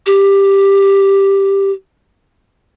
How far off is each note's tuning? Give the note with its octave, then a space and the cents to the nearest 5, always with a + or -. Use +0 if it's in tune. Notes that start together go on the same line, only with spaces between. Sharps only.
G4 +5